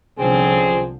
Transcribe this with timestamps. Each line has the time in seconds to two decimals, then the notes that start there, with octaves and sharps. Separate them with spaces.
0.19 C2 D3 F3 C4 C#4 G#4